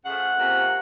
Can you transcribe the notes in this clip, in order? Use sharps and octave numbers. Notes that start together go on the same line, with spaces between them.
C#3 F3 A3 F#5
C3 F3 A#3 C#4